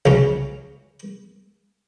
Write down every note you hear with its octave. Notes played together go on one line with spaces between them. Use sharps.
C#2 C#3 F#3 C#4